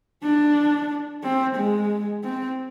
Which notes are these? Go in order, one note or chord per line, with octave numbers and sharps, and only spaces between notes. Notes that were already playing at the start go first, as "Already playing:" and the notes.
D4
C4
G#3
C4